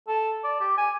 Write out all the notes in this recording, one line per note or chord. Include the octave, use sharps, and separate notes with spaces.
A4
D5
G4
G#5